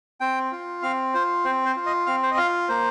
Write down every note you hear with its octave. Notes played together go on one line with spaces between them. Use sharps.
C4 G5
F4
C4 F5
F4 C5
C4 C5
C5
F4
D#5
C4 F5
C5
D#5
F4 F5
A#3 C5